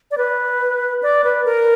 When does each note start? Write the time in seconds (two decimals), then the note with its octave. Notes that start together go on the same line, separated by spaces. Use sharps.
0.11 D5
0.18 B4
1.03 D5
1.24 B4
1.45 A#4